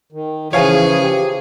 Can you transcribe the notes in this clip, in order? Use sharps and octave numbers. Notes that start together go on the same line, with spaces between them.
D#3
C#3 E3 F3 G#4 C#5 F5 G#5
G4